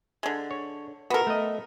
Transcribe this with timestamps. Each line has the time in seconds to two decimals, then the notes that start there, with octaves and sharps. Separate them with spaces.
0.23 D3 G#3
0.51 C#5
1.10 B3 F#4 A4 A#4
1.27 A3 D#5